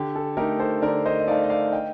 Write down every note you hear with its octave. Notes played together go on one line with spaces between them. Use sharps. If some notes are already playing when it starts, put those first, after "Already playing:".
Already playing: D3 G4
A4
A3 D#4 G4 A#4
A4 C5
D3 A#4 D5
C5 D#5
D#5
A3 D#4 D5 F5
D#5
D5 F5
D#5 G5